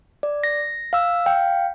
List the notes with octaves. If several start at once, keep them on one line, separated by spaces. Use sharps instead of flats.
D5
A#6
F5 E6
F5 G5